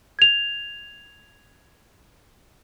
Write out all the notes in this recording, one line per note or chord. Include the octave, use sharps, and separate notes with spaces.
G#6 F7